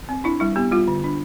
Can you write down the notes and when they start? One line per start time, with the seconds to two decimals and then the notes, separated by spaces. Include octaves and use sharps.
0.09 C4
0.24 D4 E4
0.40 G3 E4
0.56 B3 G4
0.72 G3 F4
0.88 D3
1.04 D4